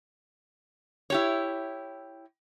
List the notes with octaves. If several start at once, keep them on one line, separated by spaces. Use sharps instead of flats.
E4 G4 C#5